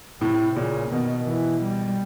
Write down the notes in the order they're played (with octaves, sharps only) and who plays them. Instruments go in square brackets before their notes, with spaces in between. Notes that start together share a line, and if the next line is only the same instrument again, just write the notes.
[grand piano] A2 [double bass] C3
[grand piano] A#2 [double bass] C#3
[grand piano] B2 [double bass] D#3
[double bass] E3
G3